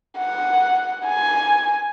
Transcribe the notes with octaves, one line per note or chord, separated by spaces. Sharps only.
F#5
G#5